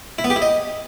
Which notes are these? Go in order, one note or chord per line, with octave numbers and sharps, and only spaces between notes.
E4
B3
G4
E4
D#5